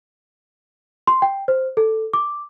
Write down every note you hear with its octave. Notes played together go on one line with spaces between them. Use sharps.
C6
G5
C5
A4
D6